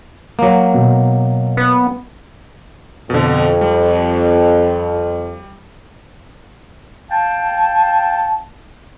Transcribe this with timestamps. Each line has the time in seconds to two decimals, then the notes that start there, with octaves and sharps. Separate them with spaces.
0.39 F#3 A#3
0.74 B2
1.57 B3
3.10 F2 B2 D3
3.61 G3
7.10 F5 G5 A5